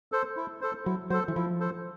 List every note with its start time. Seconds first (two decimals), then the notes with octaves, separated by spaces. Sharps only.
0.12 A4 C5
0.36 E4
0.61 A4 C5
0.85 F#3 E4
1.10 F#3 C5
1.13 A4
1.28 E3
1.36 F3 E4
1.60 A4 C5